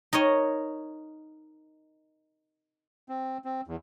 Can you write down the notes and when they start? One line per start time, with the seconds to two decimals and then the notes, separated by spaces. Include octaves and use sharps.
0.13 D#4 A#4 C#5 D#5
3.09 C4
3.45 C4
3.67 E2